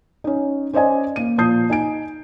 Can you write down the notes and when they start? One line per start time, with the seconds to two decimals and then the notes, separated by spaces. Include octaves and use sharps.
0.24 C#4 D#4
0.73 C#4 C5 D5 D#5 G#5
1.16 A#3 D#7
1.38 A#2 F3 A5 D#6 G6 C7
1.70 D#4 G#5 D7